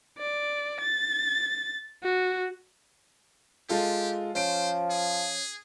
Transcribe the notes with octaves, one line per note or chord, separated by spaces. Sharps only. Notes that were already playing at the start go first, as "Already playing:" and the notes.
D5
A6
F#4
G#3 F4 G4 A4
F3 C#4 C5 D7
G#4